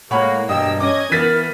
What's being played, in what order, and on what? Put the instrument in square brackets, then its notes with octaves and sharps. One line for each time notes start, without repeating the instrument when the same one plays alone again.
[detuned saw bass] A2 [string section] G#3 A#3 [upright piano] C#5 F#5 B5
[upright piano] E1 D#5 [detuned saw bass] G2 [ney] G5 [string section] E6
[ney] C#4 [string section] D#5 G#6 [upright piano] D6
[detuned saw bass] E3 [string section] B3 [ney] A#4 [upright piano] A6 B6 D#7